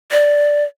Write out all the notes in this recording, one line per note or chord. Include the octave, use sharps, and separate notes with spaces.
D5